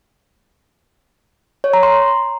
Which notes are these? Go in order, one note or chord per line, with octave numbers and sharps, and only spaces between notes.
C#5
A#5
C6